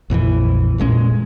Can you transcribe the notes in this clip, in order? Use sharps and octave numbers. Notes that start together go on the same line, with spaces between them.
A#1 F2 D#3 E3
F1 A#2 G#3 C#4